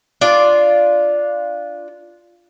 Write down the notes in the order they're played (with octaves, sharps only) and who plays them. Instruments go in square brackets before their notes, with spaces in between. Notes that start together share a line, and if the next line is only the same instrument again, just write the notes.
[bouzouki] D4 F4 D5